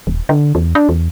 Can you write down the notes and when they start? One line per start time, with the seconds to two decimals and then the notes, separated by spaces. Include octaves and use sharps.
0.07 D#1
0.29 D3
0.55 E2
0.75 D4
0.89 E2